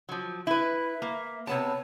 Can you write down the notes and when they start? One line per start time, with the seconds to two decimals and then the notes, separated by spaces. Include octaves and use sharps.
0.09 F3 F#3
0.47 E4 B4 E5
1.02 A#3
1.47 C3 B3 C#5 A5